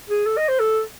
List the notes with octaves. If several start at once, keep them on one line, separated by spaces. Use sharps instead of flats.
G#4
A4
D#5
C5
A4